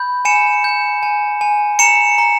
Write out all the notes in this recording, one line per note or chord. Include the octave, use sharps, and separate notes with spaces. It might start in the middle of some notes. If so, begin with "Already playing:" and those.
Already playing: B5 G6
G#5 C#7 E7
G6
G#5
G#5
A#5 C#7 E7
A#5